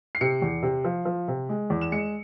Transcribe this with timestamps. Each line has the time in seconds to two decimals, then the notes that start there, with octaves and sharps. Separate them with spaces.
0.15 C7
0.21 C3 C#7
0.42 E2
0.63 C3
0.85 F3
1.05 F3
1.28 C3
1.49 G#3
1.70 E2
1.81 E7
1.92 G#3 C#7